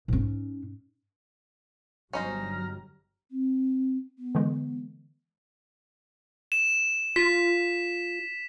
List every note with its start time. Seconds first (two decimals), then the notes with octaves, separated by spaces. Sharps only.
0.08 G#2 C#4
2.13 G1 F#3 G3 C#4 D#4 C5 A#5 F6
3.31 C4
4.18 B3
4.35 D3 E3 G#3
6.52 E7
7.16 F4 B6